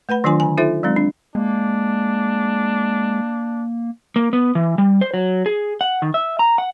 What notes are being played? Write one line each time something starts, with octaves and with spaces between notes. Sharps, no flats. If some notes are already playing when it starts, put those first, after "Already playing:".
A3 B4 F#5 B5
D#3 F#3 D4 F4 G#5 C6
D3 G#5
D#4 F4 A4 C5 E5
F#3 G#3 C4 D#4
D4
G#3 A#3 D4
A#3
B3
E3
G3
C5
F#3
G#4
F#5
D#3
E5
A#5
F#5